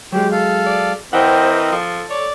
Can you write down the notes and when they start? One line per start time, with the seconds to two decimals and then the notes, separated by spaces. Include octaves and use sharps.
0.12 F#3 G#3 G4
0.32 A4 F5
0.66 D5
1.13 E3 C4 A#4 C5 D#5 F#5 G5
1.72 F3 A4
2.10 C#5 D5